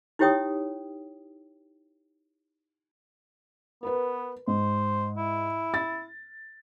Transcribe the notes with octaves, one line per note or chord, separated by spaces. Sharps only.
D#4 E4 G4 C#5 G5 D#6
B3 A#4 B4
G#2 C5
E4
A6